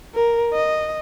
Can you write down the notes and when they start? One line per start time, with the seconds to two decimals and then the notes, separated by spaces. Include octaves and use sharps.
0.15 A#4
0.53 D#5